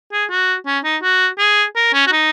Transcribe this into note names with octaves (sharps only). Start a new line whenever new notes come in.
G#4
F#4
C#4
D#4
F#4
G#4
A#4
C#4
F#4
D#4